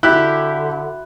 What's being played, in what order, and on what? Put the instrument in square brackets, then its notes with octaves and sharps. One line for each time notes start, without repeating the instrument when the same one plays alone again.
[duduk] D3 [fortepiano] E4 G4 [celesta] F#4 E5 B5 [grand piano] F#6